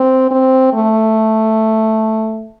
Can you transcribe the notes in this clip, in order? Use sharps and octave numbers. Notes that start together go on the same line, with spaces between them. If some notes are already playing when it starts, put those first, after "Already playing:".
Already playing: C4
C4
A3